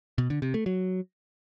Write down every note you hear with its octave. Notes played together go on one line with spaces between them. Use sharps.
B2
D3
C3
A3
F#3